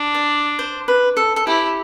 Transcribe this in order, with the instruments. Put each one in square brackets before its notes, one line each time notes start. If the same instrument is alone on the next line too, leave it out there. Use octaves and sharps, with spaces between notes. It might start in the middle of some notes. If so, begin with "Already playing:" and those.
Already playing: [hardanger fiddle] D4
[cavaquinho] D5
C5
B4
A4
A4
[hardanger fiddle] E4 [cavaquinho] G4